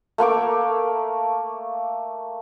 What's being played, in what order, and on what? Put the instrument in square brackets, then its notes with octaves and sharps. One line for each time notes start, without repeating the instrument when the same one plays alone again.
[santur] A3 A#3 C#6 D6